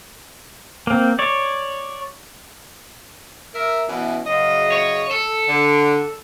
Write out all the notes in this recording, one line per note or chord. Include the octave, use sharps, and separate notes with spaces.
A#3 C4
C#5 D5
A#4 E5
B2 E3 C#4
F#2 C#3 D#5
C#5
A4
D3